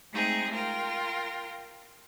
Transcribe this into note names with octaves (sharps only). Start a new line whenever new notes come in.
G#3 A3 C4 D#4 G#4
F4 A#4 G5